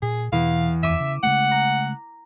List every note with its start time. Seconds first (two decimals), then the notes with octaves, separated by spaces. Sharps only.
0.02 A#2 G#4
0.32 E2 B2 E3 F5
0.83 E1 F2 E5 D6 D#7 E7
1.00 C#3
1.23 C#3 G#3 A3 F#5
1.51 A#5